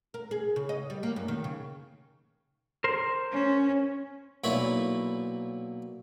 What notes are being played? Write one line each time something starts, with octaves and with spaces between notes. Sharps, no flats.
A#4
G#4
C#3
D#5
G3
A#3
F#2
D#3
C#3
A#4 C5
C#4
B1 A#2 E4 C#5 B5